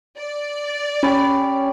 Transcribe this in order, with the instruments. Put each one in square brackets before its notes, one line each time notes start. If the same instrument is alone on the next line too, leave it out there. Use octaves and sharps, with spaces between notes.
[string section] D5
[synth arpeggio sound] C#4 [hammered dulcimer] G4 C#5 B5